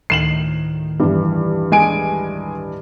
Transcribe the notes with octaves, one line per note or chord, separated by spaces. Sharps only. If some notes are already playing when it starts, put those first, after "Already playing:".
D2 A2 D#3 C7 E7 F#7
G2 E3
G#3 G#5 D7